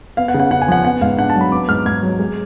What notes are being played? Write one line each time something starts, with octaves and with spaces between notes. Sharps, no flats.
B3 F5
F#5
C#3
F#5
C#3 F#5
G#5
F3 F#5
B3 F#5
G#2 F5
D4 F#5
A5
F#3
B5
B3 D6
G#2 F6
G#2 G#6
F#3
G#3